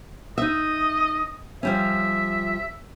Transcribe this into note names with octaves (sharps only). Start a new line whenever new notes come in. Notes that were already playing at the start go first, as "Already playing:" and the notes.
D#4 D#5 E5
F3 G3 C#4 E5